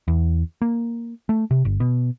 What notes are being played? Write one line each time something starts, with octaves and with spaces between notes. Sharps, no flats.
E2
A#3
A3
C3
G1
B2